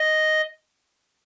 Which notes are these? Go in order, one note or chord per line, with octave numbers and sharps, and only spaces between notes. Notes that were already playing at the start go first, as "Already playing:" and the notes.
Already playing: D#5